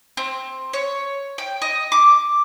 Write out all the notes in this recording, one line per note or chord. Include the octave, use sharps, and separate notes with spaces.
C4
C#5
G5
D#5
D6